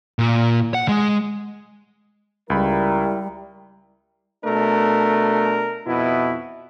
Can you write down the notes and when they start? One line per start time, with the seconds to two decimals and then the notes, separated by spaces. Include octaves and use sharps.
0.19 A#2
0.74 F#5
0.88 G#3
2.50 C#2 G3 E4 A#4 B5
4.45 B2 A3 D4 A#4
5.87 F2 B2 E4